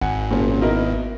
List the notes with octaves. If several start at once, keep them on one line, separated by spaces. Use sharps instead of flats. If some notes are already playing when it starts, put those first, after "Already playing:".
G#1 F#5 G#5
F#1 A#2
B2 D#4 E4 A#4